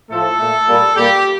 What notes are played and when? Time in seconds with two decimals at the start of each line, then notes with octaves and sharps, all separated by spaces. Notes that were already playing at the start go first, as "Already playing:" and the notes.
0.10 A2 F3 A3 A4
0.39 A#2 A3
0.67 A#2 G3 A#3
0.96 A#2 G3 A#3 G4